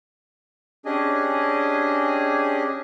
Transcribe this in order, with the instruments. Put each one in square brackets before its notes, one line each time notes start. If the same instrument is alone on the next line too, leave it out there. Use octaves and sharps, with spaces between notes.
[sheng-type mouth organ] C#4 D4 G4 G#4 D#5 G#5